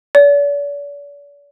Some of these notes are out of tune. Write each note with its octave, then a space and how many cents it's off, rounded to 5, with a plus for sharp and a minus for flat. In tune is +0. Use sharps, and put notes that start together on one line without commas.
D5 -45